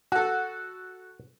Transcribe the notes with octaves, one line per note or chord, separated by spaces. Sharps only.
F#4 A4 F#5